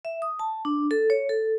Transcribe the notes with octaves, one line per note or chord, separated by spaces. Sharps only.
E5
D#6
A5
D4
A4
C#5
A4